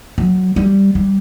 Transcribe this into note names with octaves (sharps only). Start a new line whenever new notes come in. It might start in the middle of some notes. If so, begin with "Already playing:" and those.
F#3
G3
G3